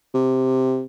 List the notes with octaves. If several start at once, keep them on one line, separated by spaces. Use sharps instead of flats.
C3